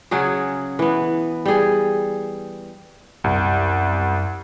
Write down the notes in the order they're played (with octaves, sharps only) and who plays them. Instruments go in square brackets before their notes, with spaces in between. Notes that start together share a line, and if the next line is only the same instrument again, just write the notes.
[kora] C#3 F#3 F#4 G#4
E3 B3
G3 G#4
[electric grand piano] C2 [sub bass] F#2